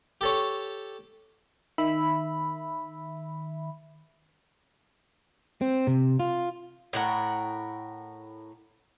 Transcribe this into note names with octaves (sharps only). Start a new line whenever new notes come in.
G4 A4 C#5
D#3 E5 B5
C4
C3
F4
A2 A#4 F#5